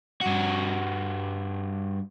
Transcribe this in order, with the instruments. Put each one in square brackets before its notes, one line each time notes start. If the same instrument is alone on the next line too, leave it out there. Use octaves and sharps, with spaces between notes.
[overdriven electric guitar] G2 F#4